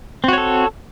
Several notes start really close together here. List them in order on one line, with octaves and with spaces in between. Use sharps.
C4 F#4 C#5 A4